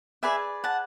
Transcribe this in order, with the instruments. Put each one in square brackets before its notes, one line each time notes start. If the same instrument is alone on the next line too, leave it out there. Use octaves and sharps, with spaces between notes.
[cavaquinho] G#4 B4 D5 E5 G#5
F#5 A5